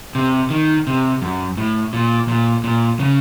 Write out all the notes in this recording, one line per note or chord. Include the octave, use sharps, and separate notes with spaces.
C3
D#3
C3
F#2
A2
A#2
A#2
A#2
C#3